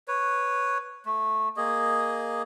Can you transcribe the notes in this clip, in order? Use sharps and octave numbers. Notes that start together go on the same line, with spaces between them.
B4 C#5
A3
A#3 G#4 D#5